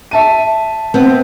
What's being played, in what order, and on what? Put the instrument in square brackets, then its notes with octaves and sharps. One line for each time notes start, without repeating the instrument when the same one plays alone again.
[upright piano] E5 A5 D#7
[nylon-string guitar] B3 C4